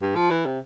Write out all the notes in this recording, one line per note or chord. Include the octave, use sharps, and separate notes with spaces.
G2
F3
E3
C3